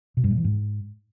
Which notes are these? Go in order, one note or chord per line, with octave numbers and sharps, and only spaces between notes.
B2
G2
A#2
E3
G#2